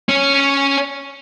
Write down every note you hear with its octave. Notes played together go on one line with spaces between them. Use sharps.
C#4 C#5